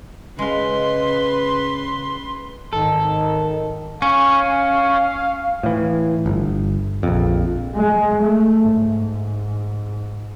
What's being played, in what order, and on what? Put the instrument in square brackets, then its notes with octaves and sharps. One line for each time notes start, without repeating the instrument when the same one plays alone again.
[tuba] C#3 [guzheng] G#3 F5 [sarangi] B4 [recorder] C6
[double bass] G#1 [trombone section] D#3 [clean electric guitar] A4
[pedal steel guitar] C#4 [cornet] F5
[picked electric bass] A2 E3
G1
A#1 F2
[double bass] G#3
A3
G#2